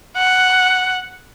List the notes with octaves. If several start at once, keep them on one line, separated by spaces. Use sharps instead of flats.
F#5